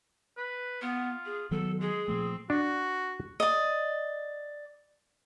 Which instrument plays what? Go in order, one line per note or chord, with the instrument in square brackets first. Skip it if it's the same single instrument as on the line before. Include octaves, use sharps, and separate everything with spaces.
[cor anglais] B4
[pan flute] B3 [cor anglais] F4
[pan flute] G#4
[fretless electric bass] D#3 F#3 B3 [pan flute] A4
[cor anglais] G#3 [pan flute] G#4
[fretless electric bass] A#2 F3 A3 [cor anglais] C4
[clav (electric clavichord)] D4 [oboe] F#4
[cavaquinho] D5 D#5